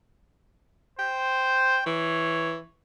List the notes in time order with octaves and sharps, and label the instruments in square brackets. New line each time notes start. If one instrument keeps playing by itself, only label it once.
[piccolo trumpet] C5 [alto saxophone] G5
[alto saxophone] E3 [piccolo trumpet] C#5